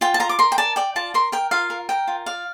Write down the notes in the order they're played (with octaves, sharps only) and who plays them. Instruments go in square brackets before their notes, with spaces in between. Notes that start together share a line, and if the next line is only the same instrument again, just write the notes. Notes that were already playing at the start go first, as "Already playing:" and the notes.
[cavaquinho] F4 G5
A5
F4 A#5
D6
A#4 C6
G5
D5 A5
D5 G5
F4 A5
A#4 C6
A#4 G5
F4 F5
A#4
A#4 G5
F4
D5 F5